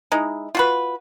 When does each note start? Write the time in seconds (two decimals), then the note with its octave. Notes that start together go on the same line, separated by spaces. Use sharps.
0.12 G#3 D#4 E4
0.55 F4 F#4 B4